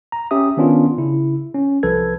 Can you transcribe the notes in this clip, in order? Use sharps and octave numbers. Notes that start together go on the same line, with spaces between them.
A#5
C#4 G4 E5 D#6
D#3 B3 C#4 D4 F4
C#3 E4
C#4
C2 F3 A4 B4 G#6